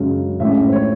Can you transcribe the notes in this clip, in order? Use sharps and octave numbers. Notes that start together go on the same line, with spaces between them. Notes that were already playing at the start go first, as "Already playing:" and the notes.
Already playing: F#2 C#3 G#3 C#4
A2 G#3 C#4 E5
C5
C#5